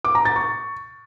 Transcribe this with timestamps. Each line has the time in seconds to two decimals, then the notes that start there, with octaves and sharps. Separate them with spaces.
0.05 D6
0.15 A#5
0.25 A6
0.36 C#6